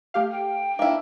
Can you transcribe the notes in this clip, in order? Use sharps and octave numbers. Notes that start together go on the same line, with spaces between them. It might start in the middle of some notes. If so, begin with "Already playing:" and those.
A3 G4 F5
G5
A#3 D4 E4